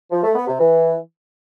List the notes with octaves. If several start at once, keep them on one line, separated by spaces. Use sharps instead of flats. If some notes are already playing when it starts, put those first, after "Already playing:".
F3
A3
B3
C3
E3